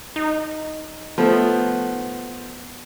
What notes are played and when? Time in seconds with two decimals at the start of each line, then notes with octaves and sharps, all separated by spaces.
0.16 D#4
1.18 F3 A3 B3